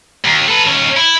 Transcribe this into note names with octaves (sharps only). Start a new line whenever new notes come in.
D#2
A4 B4
D#2 C#4
E4